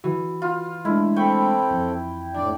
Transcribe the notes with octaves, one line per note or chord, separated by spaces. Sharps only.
E3 F#4
F4
G#3 A3 D4 E4
C4 A4 G5 B5 C#6
F2
A2 D4 D5